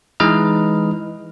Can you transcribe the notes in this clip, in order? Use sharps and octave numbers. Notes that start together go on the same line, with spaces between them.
E3 G#3 D#4 B4 D#5 F6